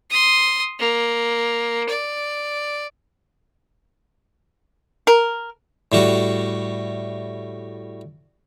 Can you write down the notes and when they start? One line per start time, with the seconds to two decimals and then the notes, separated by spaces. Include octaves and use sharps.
0.10 C6 D#6
0.79 A#3
1.89 D5
5.07 A#4
5.92 A2 G3 F#4